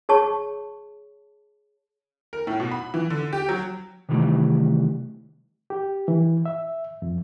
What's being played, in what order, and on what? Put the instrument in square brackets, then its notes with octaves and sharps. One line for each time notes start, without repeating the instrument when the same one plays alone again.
[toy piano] G#4 C#5 A5 C#6
[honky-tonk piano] A#4
A2
B2
B5
E3
D3
G4
F#3
[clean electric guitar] C3 D#3 E3 F#3 G3 A3
[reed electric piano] G4
E3
E5
F2